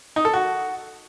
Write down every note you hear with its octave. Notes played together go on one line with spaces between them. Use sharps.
D#4
A4
F#4